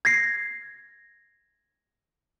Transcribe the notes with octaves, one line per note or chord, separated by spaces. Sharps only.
G#6 A#6 C7